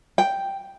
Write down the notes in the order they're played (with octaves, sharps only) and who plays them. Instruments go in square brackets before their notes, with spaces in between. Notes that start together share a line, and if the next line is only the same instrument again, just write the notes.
[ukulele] G5